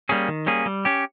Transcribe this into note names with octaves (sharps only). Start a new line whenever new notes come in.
G3 A#3 C#4 G#4
D#3
G3 A#3 C#4 G#4
G3
C#4 G4